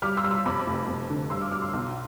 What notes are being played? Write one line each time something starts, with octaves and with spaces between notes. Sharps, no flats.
G3 D6 F6
C6 E6
G3
C6 E6
F2 B5 D6
F1
F2
D3
G3 C6 E6
D6 F6
G3 D6 F6
C6 E6
B1